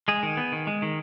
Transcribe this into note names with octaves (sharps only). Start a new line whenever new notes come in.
G#3 G#4
D#3
B3
D#3
G#3
D#3